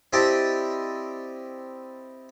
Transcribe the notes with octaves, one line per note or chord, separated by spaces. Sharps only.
C4 E4 G4 D5 D#5 A5